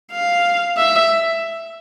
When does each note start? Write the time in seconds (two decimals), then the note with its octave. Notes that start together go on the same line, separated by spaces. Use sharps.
0.12 F5
0.77 E5